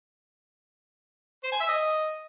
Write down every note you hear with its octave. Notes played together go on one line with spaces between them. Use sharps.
C5
G#5
E5
D#5